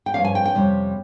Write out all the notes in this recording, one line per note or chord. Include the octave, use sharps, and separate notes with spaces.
G5
G2 F3 A#3 C#4 F5
G#5
G5
G5
F2 C3 G3 C#4